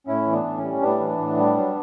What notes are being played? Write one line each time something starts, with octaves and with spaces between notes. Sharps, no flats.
A2 C#4 E4
E3
B3 D4
A2
C#4
G3
A2 B3 D4
E3
A2
G3
F#3